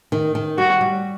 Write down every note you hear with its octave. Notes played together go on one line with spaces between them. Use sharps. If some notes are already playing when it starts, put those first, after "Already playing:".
D#3
D#3
G3 F#4
G3